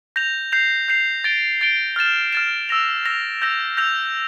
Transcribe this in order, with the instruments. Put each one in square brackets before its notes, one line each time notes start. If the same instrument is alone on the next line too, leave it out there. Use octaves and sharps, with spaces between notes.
[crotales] G6 A#6 F7
G6 C7 F7
G6 C7 F7
A6 D7 G7
A6 D7 G7
F6 A6 E7
F6 A6 E7
E6 A#6 F7
E6 A#6 F7
E6 G6 A#6 F7
E6 G6 A#6 F7